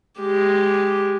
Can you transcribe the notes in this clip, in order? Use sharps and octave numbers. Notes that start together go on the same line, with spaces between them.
G#3 G4